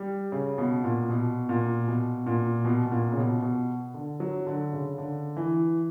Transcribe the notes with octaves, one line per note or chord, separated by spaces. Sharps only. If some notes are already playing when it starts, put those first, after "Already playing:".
Already playing: G3
C#3
B2
A#2
B2
A#2
B2
A#2
B2
B2
A#2
C#3
B2
B2
D3
F#3
D3
C#3
D3
E3